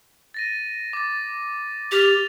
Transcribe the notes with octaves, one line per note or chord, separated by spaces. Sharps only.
A6 A#6 D#7
D6 A6
G4 F6 A6 F7